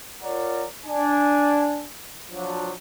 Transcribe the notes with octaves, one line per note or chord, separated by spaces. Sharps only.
F4 A#4 C#5 D5 F#5 A#5
D4 G#5
F3 F#3 D4